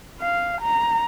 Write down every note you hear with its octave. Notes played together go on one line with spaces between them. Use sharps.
F5
A#5